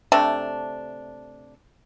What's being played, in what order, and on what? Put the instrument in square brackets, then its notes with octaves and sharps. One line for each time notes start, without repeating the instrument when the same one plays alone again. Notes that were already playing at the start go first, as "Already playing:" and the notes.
[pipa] C3 A3 D4